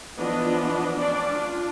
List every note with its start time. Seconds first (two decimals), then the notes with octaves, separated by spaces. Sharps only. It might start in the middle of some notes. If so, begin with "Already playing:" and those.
0.18 E3 F3 B3 D4 D#5
0.98 C#4 D4 D5
1.30 D4 F4